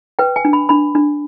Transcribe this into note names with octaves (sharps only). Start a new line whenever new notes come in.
B4 G5
G#5
D4
B5
D4 B5
D4